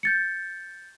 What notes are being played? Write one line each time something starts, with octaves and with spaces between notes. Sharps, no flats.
G6 A6 C#7